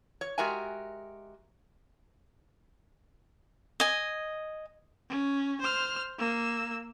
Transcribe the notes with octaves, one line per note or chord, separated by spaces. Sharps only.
C#5
G#3 F#4 G4 A#4 E5 G#5
D#5 G#5
C#4
C5 F6
A#3 E6